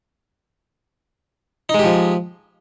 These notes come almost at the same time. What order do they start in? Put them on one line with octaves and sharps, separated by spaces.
D#4 G#3 G4 F3